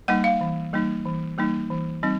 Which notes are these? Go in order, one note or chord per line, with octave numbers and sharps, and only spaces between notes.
G3 A#3 D#4 F#5
F5
E3
G3 A#3 D#4
E3
G3 A#3 D#4
E3
G3 C4 D#4